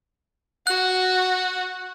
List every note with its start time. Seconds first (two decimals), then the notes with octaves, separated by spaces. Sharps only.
0.67 F#4 F#6